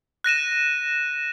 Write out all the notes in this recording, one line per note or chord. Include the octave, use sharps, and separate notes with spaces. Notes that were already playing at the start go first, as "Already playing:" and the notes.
F#6 A#6 D#7 E7